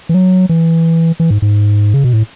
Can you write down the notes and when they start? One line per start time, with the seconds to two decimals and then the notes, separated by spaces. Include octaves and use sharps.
0.09 E3
0.14 F#3
0.49 E3
1.20 E3
1.31 G#2
1.42 G#2
1.94 C#3
2.04 B2
2.13 A2